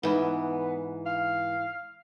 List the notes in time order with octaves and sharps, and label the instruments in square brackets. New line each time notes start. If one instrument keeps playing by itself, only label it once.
[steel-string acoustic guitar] G#2 E3 [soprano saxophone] B3
[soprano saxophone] F5